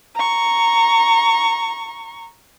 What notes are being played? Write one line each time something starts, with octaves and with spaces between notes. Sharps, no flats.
A#5 C#6